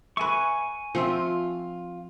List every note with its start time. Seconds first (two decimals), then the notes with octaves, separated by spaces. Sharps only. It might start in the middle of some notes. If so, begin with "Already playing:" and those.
0.17 B4 E5 G#5 C#6
0.95 F3 C4 F4 E5